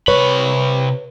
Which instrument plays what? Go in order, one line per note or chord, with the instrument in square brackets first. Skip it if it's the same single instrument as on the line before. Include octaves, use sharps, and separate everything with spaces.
[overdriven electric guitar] C3 B5 [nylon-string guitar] B4 C#5